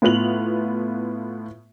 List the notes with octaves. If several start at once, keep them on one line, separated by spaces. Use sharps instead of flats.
A2 B3 F4 B4 F7 F#7